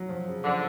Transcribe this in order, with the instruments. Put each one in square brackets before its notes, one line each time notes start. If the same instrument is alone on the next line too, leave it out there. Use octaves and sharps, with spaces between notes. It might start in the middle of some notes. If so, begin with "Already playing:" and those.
Already playing: [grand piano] F#3
F3
C#3
[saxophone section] D3 [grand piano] F3